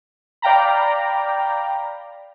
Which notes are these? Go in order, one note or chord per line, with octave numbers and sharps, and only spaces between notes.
D5 F5 G5 A#5 B5